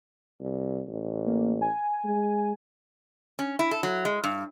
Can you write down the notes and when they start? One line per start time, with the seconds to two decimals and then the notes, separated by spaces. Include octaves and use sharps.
0.40 C2
0.88 A1
1.27 A#3
1.61 G#5
2.04 G#3
3.39 C#4
3.59 E4
3.71 A4
3.83 F#3
4.05 G#3
4.24 G2